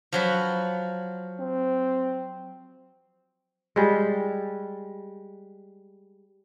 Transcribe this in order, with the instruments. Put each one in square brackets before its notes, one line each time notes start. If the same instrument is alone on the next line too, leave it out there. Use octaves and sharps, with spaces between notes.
[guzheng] F3 F#3 B4
[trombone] C4
[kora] G3 G#3